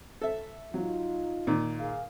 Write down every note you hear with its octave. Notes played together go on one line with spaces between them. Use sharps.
A4 E5
F#3 D#4 F4
A#2 D#3
G#4 A#4 F5